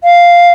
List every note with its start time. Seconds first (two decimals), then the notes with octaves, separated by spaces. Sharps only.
0.04 F5